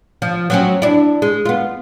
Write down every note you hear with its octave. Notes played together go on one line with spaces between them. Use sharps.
F3
F#3 C4 C#4
D4 E4
G#3
B3 F4